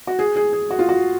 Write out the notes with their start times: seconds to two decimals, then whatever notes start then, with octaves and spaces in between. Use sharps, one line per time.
0.07 F#4
0.19 G#4
0.36 G#4
0.53 G#4
0.70 F#4
0.79 F4
0.89 F#4